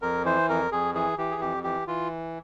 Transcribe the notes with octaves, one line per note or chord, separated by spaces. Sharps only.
F2 A#4
E3 C5
F2 A#4
F2 G#4
E3 G#4
E3 G4
G#4
F2 G4
E3 G4
E3 F4